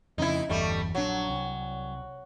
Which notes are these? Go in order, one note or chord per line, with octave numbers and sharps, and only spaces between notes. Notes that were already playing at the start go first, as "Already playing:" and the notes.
F2 C#3 D#4 E4
G1 E2 G3 A3
A#1 F#3 D4
C2